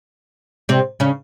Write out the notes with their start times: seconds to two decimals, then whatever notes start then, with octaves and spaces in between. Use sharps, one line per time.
0.69 C3 C4
1.00 C#3 C#4